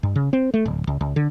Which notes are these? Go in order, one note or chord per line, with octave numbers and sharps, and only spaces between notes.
G2
C#3
C4
A3
D1
C#2
C#2
D3